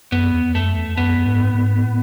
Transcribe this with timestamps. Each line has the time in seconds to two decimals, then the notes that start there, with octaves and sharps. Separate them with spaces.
0.12 F#2 B3
0.34 E2
0.54 F#2 A3
0.76 E2
0.97 F#2 B3
1.26 G#2
1.55 G#2
1.83 A2